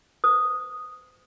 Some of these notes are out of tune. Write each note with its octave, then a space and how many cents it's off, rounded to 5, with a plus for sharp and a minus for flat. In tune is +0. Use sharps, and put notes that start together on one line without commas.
C5 -40 D#6 +0